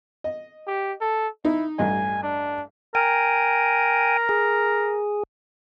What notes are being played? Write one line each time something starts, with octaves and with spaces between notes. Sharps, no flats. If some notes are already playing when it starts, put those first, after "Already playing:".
D#5
G4
A4
D#4 E4
A1 G2 D#5 G#5
D4
A#4 G5 G#5
G#4